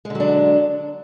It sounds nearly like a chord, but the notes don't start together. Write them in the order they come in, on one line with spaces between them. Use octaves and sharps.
G#3 D3 F#3 D4